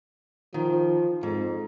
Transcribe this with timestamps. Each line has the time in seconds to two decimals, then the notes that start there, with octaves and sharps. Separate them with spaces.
0.54 D#3 F3
1.23 F2 G#2